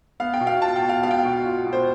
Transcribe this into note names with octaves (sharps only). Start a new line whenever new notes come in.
B3 F5
G5
B2
F5
F4 A5
G5
B2
F5
B3 F5
G5
F5
B2
F4
B2
C5